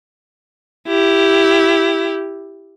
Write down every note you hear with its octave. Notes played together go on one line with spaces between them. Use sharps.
E4 G4